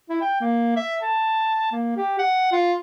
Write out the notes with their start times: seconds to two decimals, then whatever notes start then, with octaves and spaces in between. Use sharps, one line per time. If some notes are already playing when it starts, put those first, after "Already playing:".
0.09 E4
0.21 G5
0.41 A#3
0.77 E5
1.02 A5
1.72 A#3
1.96 G4
2.19 F#5
2.52 F4